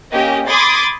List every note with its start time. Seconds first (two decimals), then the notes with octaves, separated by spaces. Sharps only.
0.12 A#3 C#4 G4 D#5
0.46 B5 C6 D6 D#6 G#6 A6